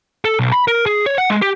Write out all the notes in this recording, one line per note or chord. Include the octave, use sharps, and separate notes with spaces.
A4
B1
B5
A#4
G#4
C#5
F#5
G#3
G4